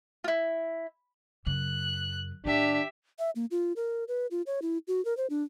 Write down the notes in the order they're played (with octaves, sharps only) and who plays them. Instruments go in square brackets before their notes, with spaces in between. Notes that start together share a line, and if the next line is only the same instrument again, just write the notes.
[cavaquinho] E4 F4
[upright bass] F#2 C#3 [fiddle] F#6
[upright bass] A2 D#3 [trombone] D4 [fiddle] G4 E5
[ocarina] E5
A#3
F4
A#4
B4
F4
C#5
E4
F#4
A#4
C5
D4